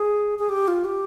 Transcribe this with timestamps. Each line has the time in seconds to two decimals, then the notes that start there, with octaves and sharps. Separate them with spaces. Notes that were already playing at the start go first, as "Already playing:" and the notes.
Already playing: G#4
0.39 G#4
0.49 G4
0.68 F4
0.85 G4